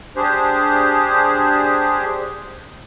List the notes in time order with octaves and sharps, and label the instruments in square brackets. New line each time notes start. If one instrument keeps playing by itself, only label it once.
[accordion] D4 G4 G#4 C5